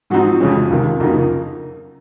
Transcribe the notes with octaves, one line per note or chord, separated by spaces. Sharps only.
G#2 F3 C4 D#4 F#4
F2 C#3 F3 G#3 C#4
C#2 C3 D#3
F2 C#3 F#3 A#3 D#4 A#4